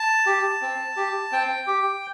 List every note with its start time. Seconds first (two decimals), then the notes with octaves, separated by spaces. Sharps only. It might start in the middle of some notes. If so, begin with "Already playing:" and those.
Already playing: A5
0.26 G4
0.62 C4
0.96 G4
1.32 C4 G5
1.67 G4